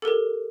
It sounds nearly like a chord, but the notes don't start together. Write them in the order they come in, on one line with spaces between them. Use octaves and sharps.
A4 A#4 G4